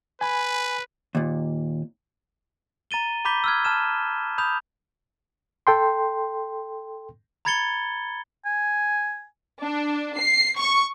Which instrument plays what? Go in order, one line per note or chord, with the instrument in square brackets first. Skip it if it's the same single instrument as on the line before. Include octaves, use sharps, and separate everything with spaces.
[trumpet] B4 [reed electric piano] G#5 B5
[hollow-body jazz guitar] D#2 A#2
[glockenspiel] A#5 A6 D#7 G7
A#5 B5 D6 G6 B6 G7
E6 F6 G#6
A5 F6 E7
B5 D#6 G6 F7
[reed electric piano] A4 G5 C6
[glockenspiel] A#5 B5 G#6 A6 C#7 G7
[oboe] G#5
[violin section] D4
C7
C#6